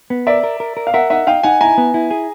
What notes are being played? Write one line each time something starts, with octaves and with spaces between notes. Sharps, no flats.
B3
A#4 D5 E5
A#4
A#4
A#4
F5
A#4 E5 F#5
D#4 E5 F#5
D#4 F5 G5
D#4 F#5 G#5
E4 G#5 A#5
B3
E4
G#4